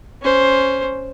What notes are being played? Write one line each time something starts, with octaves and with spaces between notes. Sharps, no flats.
C#4 C5